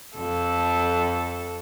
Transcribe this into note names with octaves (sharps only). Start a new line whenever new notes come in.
F2 A4